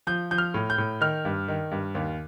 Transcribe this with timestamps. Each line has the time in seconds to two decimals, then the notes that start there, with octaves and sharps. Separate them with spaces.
0.07 F3 G6
0.31 F3 G6
0.38 F6
0.54 A2
0.70 G6
0.78 A2
1.01 D#3 F6
1.25 G2
1.48 D#3
1.71 G2
1.95 D#2